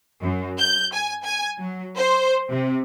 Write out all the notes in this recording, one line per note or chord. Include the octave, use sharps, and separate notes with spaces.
F#2
G6
G#5
G#5
F#3
C5
C3